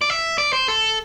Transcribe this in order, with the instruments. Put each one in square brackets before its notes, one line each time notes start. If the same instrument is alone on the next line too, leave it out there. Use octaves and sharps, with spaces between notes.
[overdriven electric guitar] D5
E5
D5
C5
A4